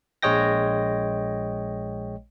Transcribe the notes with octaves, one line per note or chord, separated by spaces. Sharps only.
A#1 G#3 C#5 D#5 G5 A#6